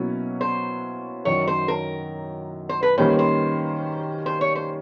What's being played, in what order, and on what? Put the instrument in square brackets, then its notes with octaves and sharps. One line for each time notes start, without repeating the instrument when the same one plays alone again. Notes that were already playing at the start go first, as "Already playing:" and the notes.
Already playing: [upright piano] B2 F#3 A#3 C#4 E4
[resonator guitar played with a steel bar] C5
[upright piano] F#2 D#3 F#3 [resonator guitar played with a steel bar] C#5
[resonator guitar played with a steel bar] C5
A#4
C5
B4
[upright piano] D#3 G3 A#3 C#4 [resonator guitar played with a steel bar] C5
[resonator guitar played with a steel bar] C5
C5
C#5
C5